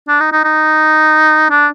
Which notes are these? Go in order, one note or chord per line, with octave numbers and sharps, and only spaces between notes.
D4
D#4
D#4
D#4
D4